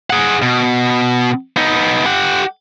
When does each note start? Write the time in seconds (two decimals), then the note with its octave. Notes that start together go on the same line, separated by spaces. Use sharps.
0.10 G#4 F#5
0.42 B2
1.57 B3 D#4
2.06 G4 F#5